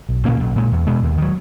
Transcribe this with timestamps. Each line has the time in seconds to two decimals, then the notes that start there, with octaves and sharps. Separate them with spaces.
0.09 B1
0.25 A#2 A#3 C#4
0.40 B1
0.56 A#2 G#3
0.72 E2
0.87 B2 G#3 B3
1.03 D#2
1.17 D#3 F#3